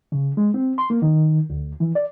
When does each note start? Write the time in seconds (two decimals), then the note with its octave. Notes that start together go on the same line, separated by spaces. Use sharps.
0.12 C#3
0.37 G#3
0.54 C4
0.78 C6
0.90 A#3
1.02 D#3
1.50 D2
1.80 E3
1.95 D5